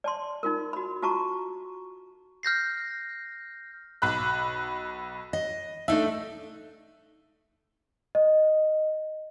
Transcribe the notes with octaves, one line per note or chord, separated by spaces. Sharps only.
D5 A5 C6
D#4 F4 A#4
F#4 B5
F4 F#4 A5 A#5 C#6
F6 G6 A#6 C7
B1 B5 F#6
D#5
A3 D4 D#4 E5
D#5